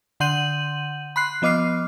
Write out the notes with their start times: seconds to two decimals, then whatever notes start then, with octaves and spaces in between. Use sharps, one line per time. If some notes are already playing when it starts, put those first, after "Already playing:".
0.20 D3 F#5 C6 G6 D#7 F#7
1.16 B5 C6 F#6 C7
1.42 F3 B3 D#5 D6 F6 C7